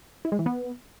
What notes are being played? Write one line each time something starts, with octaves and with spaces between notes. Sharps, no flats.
E4
G#3
E3
B3